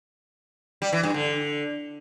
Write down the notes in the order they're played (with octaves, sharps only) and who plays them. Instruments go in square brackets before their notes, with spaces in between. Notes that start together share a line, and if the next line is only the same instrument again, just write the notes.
[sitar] G3
E3
G2
D3